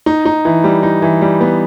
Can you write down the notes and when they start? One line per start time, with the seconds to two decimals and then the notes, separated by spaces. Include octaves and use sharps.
0.06 D#4
0.25 D#4
0.45 E3
0.64 G3
0.83 D#4
1.02 E3
1.22 G3
1.41 B3